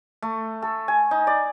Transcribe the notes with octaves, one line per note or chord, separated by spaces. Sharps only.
A3
A4
G#5
D#4
D5